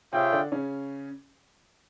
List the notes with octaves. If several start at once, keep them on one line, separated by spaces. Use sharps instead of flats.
C3 C4 F4 G#4 C#5 E5 G5
D3 D4
C#3 C#4